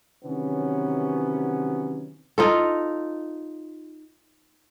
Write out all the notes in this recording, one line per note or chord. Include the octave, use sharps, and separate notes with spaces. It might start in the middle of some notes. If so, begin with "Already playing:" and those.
C3 D#3 E3 F#3 B3 C#4
D#4 F4 A4